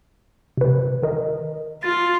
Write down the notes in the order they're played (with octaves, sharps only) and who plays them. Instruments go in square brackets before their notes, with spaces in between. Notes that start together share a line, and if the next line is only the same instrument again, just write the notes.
[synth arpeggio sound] C3 B4
D#3 A#4 D#5
[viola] F4 [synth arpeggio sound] A6